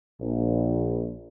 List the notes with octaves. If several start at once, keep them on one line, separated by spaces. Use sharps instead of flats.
A#1